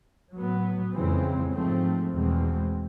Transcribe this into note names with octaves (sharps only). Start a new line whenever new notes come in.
A2 F#3 B3
F2 C#3 E3 G#3 C4
G#2 F3 A3 C4
E2 B2 G#3 C4